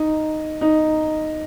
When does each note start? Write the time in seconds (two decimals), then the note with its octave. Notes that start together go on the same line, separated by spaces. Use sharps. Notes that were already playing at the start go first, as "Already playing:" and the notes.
Already playing: D#4
0.61 D#4